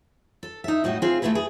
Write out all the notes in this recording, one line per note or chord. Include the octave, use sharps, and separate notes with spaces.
A4
D#4 E5
A2 G3 F#4 D#5
C4 F4 G#4
A3 C#4 E4 G#4 B4
G#4